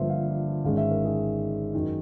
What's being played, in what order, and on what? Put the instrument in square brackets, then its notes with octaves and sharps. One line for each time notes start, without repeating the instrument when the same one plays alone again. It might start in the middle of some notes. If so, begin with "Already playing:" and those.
Already playing: [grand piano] G1 G2 D3 F3 A#3 C5 E5
F5
G#1 G#2 D#3 G#3 C#4 F5
E5
A#4
G#4
F#2 D#3